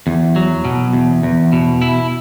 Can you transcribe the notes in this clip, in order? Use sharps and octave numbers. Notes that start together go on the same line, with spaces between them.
E2
F#3
B2
E2
E2
B2
E4